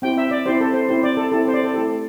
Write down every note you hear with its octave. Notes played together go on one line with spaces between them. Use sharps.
C4 E4 G4 G5
E5
D5
C4 E4 G4 C5
A4
C5
C4 E4 G4 C5
D5
A4
C4 E4 G4 A4
C5
D5
A4
A3 E4 G4 A4